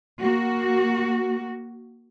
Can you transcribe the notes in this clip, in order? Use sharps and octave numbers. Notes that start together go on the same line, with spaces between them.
A#3 F#4